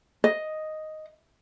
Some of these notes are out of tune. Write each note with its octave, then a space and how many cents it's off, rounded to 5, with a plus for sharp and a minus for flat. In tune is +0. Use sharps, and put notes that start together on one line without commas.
D#5 +0